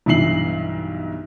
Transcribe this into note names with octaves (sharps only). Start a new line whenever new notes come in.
B1 G2 E3 E5 C7 F#7